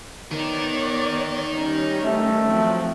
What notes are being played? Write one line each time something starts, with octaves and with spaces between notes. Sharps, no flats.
B3 D#4 A#4 C#5 D5
D#3 G3 C#4
A3
F3 F#3 C4